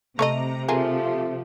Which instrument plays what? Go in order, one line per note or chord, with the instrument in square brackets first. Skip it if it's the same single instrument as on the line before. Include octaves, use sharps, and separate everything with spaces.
[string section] C3 [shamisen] A3 C#5 D#5 [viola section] A#5
[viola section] F3 G4 [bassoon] A3 [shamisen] F4 G#4 A#4